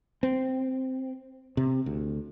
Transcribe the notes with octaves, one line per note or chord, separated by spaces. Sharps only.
C4
C3
D2